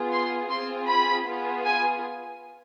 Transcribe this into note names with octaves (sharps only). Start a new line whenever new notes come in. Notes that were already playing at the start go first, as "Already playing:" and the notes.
Already playing: B3 F4 G#4
C6
C4 F4 G#4 C6
B5
B3 F4 G#4
G#5